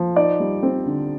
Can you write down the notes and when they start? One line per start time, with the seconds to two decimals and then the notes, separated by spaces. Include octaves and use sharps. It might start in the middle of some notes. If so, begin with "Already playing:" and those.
Already playing: F3
0.16 D#4 D5
0.40 G3
0.63 C4
0.86 D3